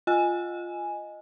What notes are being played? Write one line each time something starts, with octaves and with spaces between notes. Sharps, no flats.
F4 D#5 G#5